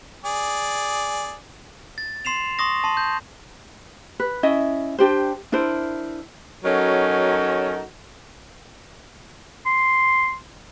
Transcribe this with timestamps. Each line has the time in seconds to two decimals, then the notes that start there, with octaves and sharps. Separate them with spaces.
0.25 G#4 D5
1.98 A6
2.25 C6 C7 E7 F7
2.59 C6 C#6 D#6 A#6
2.84 A5 C6
2.97 G6
4.20 B4
4.43 C#4 E4 D#5 E5
4.98 D4 G4 C5
5.52 D4 E4 A#4 C5
6.64 F#3 C#4 D#4 F#4 A4 A#4
9.66 C6